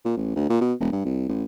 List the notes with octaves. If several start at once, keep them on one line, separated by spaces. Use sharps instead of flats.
A#2
A1
D2
A#2
B2
E1
G2
C2
A1